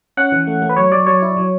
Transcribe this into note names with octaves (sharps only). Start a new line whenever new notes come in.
C#4 F#5
E3
A3
A3
B4
F#3 C#5
F#3 D5
F#3 C#5
E4
F#3